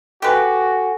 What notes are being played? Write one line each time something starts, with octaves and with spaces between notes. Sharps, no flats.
F#4 G4 A4 B4 G#5 C#6